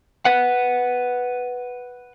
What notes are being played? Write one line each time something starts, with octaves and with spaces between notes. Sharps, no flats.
B4 F#5